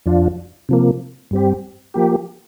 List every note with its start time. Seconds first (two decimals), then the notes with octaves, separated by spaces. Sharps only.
0.06 F2 F3 D4 F4
0.69 C3 F3 A#3
1.31 G2 G3 C4 G4
1.94 F3 A#3 G4